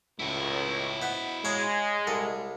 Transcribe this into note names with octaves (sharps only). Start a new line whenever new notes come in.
C#2 A2 E4 F#4
B3 C5
G#3 C#5 F5 A#5
C2 A4